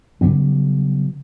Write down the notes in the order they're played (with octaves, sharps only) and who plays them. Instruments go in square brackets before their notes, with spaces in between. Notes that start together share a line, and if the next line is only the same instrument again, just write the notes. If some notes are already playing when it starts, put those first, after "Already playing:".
[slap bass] C#3 F#3 G3 B3